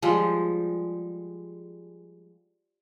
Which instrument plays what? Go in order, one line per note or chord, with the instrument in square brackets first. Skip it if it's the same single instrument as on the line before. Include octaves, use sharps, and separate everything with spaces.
[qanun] F3 G3 G#3